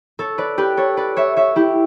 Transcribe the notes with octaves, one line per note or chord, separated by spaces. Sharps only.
A4 C#5
B4 D5
G4 B4
A4 C#5
B4 D5
C#5 E5
C#5 E5
E4 G4